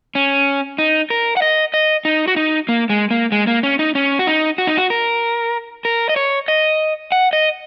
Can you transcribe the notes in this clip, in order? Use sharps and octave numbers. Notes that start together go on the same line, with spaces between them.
C#4
D#4
A#4
F#5
D#5
D#5
D#4
F#4
D#4
A#3
G#3
A#3
G#3
A#3
C#4
D#4
C#4
F#4
D#4
F#4
D#4
F#4
A#4
A#4
D#5
C#5
D#5
F#5
D#5